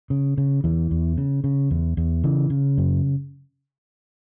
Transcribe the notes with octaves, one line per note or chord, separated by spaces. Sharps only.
C#3
C#3
E2 E3
E2
C#3
C#3
E2
E2
C#3 E3
C#3
F#2